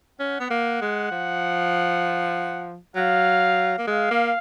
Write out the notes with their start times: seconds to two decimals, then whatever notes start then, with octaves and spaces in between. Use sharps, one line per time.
0.20 C#4 F#5
0.40 B3
0.51 A#3
0.82 G#3
1.11 F3
2.95 F#3 F5
3.79 A#3
3.87 G#3 F5
4.11 A#3